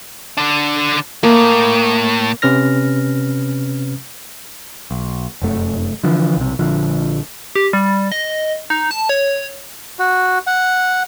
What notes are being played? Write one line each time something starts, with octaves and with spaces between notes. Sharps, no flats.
D3 D4
A2 A#3
C3 C#4 B4 F6 A#6
B1
F1 F#2 A3
D3 E3 F3
B1 C3
A#1 D3 F3
G4
G3
D#5
D#4
A5
C#5
F#4
F#5